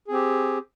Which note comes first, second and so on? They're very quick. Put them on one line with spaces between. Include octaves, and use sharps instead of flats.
G#4 C4 G4